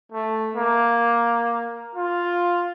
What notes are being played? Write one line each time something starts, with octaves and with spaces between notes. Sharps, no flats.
A3
A#3
F4